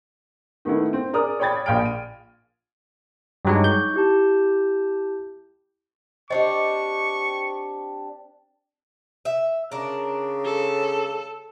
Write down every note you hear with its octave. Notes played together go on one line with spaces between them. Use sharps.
D#3 A3 B3 E4
C4
G#4 A#4 D5 D#6 F6
C#5 D5 G5 B5 G#6 A6
A#1 F5 G5 B5 F6 D7
D#7
G2 F#3 G#3 D#4 C#5 D6
C#6 G6
E4 G4 A5
C4 D4 G4 D#5 C#6
E5
C#3 D4 A#4
A4